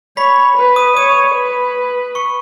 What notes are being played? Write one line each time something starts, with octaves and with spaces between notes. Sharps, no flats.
C#5 B5 B6
B4
D#6 D#7
C#5 D#6 D#7
B4
C#6 C#7